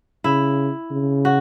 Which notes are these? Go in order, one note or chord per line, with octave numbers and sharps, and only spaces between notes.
C#3 E4
C#3
F#4